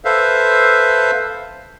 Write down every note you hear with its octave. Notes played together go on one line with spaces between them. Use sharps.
A4 B4 C5 E5 F5